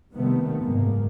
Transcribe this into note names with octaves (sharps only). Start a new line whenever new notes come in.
C3 D#3 G3 A3 B3 C4
F#1 G#2 G#3 A#3